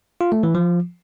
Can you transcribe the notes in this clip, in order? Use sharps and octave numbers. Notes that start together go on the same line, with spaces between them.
F4
A3
E3
F3